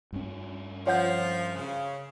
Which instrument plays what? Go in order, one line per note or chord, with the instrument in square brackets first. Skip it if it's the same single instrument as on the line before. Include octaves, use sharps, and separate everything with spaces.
[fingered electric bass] G2 C#4
[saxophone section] F3 [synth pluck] C#5 F#5 G6
[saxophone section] C#3